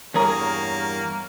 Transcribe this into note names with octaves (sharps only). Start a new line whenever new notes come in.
E2 G2 A#3 G#4 A#4 C#5 A#5